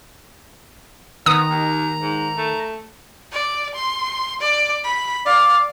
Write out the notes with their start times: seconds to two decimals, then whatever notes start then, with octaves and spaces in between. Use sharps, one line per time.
1.26 D#3 B3 A#5 D#6
1.49 D#2
2.02 G#2
2.37 A3
3.32 D5
3.75 C6
4.41 D5
4.84 B5
5.26 D5 F5